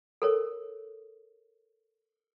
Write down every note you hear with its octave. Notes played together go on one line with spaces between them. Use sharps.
A4 A#4 C#5